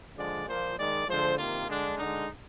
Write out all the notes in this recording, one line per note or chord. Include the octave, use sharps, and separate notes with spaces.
D3 F3 G#3 D5
A#2 F3 A#3 C5
D#3 G#3 D5
D3 F3 G#3 C5
C3 D#3 A#3 F4
D3 G#3 D4
D3 G#3 D#4